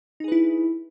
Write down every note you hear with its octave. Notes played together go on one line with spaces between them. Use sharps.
D#4 E4 G#4 B4